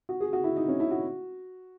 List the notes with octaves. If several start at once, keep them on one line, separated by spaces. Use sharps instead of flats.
F#4
G#4
F#4
E4
D#4
C#4
E4
F#4